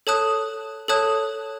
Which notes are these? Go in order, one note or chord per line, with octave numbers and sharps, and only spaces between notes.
A4 C#5 A5 D#6 F#6
A4 C#5 A5 D#6 F#6